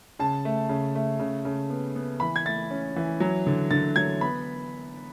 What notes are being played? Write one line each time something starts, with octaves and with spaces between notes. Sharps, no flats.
C#3 A5
A3
C#3
A3
C#3
C#3
B3
B3
E3 B5
G#6
A3 A6
C#4
E3
F#3
D3
D3 A6
F#3 G#6
B3 B5